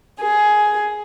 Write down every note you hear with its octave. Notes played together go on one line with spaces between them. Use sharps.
G#4